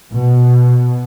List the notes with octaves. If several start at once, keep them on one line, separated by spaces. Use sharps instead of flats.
B2